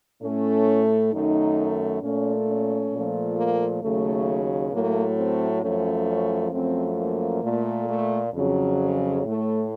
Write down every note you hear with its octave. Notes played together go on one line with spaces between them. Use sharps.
A2 A3 C#4
F#2 D#3 A3 D#4
A#2 A3 C#4
C#4
A#2 F3 A3
A#3
D#2 C#3 F#3 A3
A2 F#3 A3 A#3
C4
F#2 F3 A3 C#4
C#4
F#2 F3 A3 C4
A#3
A#2 A3
A3
F2 C#3 F#3
A2 A3